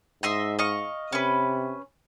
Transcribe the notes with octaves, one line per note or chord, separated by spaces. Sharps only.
G#2 D#5 E5 C6
D#5 F5 C#6
C3 C#4 B4